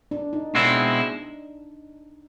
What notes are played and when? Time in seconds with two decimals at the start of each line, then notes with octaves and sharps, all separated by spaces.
0.11 D4
0.33 D#4
0.54 B2 G#3 C4 D4 E4